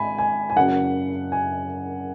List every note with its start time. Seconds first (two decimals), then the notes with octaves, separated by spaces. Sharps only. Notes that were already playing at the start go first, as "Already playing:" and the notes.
Already playing: G#1 G#2 G#5 B5
0.18 G#5
0.50 G#5
0.56 F#1 F#2 C#3 F#3 F#5
1.32 G#5